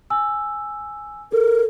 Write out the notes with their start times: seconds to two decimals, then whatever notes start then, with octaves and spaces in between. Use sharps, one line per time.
0.10 G#5 E6
1.32 A4 A#4